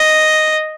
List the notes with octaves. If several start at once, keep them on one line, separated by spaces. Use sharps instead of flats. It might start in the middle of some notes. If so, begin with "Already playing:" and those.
Already playing: D#5